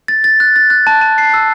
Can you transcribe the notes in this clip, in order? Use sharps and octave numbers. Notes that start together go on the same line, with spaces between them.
A6
A6
F#6
A6
F#6
A5
A5
C7
E6